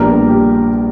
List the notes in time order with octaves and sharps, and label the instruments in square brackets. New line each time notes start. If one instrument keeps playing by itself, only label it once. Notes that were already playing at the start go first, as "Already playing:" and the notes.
Already playing: [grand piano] A#1 A#2 G3 B3 D4 A#4
G4